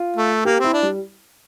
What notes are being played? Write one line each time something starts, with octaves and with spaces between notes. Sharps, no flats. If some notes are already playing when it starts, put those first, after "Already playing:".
Already playing: F4
A3
A#3 G4
C4 E4
D4
G3